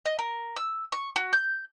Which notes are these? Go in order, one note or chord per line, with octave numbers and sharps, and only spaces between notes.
D#5
A#4
E6
C#6
F#4
G6